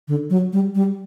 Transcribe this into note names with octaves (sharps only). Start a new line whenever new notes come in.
D3
F#3
G3
G3